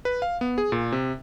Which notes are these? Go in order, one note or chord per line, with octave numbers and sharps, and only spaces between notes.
B4
F5
B3
G#4
A#2
C3